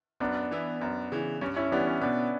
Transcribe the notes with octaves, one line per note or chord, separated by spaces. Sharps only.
F#2 B3 D4
E3 B3 E4
F#2 B3
C#3 E3
G2 C#4
C#4 E4
E3 G3 B3 D4
C#4
B2 B3 D4